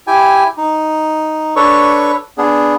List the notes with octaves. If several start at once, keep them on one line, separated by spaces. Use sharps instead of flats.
E4 G4 G5 G#5
D#4
D4 A4 B4 C#5 C#6
B3 D4 G#4